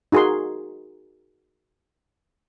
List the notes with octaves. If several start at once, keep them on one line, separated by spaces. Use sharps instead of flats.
D#4 F#4 G#4 A#4 C6